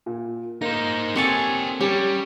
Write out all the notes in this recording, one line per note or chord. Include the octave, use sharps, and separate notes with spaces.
A#2
A#3 D#4 C5 A#6
C4 G4 A4 C#5 F#5 G#5
G3 C#4 G4 C#5